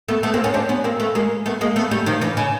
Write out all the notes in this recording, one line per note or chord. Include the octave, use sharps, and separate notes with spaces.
A3 B3
A3 B3
A#3 C4
B3 C#4
C4 D4
B3 C#4
A#3 C4
A3 B3
G#3 A#3
A3 B3
G#3 A#3
A3 B3
G3 A3
D#3 F3
D3 E3
C#3